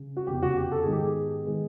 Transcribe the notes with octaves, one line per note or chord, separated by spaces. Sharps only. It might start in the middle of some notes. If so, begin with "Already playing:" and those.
Already playing: C#3
F#4
F1 E2 C#3 G4
F#4
G4
A4
G#2 D#3 G#3 B3 G#4
G4
G#4
D#3 G#3 B3